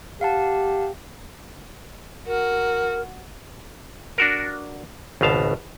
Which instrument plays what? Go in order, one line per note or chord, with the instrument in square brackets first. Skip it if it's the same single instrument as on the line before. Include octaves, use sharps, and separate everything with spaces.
[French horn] G4 [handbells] F5 F#5 A5
[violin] F#4 [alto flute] A#4
[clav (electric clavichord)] D4 F#4 A#4
G#1 C#2 B2 F5 A5